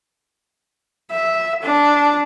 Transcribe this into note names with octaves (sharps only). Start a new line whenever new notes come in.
E5
D4